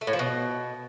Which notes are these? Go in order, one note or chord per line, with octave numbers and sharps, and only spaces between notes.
A3
A2
F3
B2